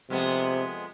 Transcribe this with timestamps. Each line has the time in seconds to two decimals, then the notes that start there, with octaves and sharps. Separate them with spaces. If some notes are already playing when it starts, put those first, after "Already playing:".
0.10 F2 C3 G#3 B3